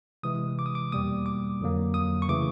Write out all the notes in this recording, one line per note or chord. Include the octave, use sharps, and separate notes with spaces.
C3 E3 G#3 D#6
D6
D#6
D6
E2 B2 G3 A#3 D#6
D6
F2 D3 F#3 A#3
D#6
C#6
C#3 E3 A3 D6